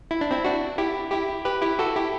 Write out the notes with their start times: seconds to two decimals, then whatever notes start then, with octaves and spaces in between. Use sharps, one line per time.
0.11 E4
0.21 D4
0.31 C4 E4
0.45 D4 F#4
0.78 E4 G4
1.12 E4 G4
1.45 G4 B4
1.62 E4 G4
1.79 F#4 A4
1.95 E4 G4